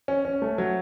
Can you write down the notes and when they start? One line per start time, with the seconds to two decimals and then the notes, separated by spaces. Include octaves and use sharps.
0.08 C#4
0.25 C#4
0.42 A3
0.58 F#3